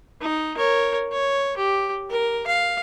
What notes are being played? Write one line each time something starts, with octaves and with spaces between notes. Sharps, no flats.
D#4
A#4 C#5
C#5
G4
A#4
F5